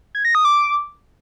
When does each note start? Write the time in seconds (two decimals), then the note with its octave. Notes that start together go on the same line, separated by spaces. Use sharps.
0.15 G#6
0.25 A#6
0.35 D#6
0.45 D6